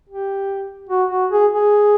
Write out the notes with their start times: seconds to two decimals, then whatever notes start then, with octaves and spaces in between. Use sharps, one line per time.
0.09 G4
0.89 F#4
1.11 F#4
1.31 G#4
1.53 G#4